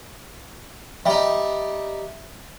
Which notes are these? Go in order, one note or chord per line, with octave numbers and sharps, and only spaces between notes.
G3 D#4 E5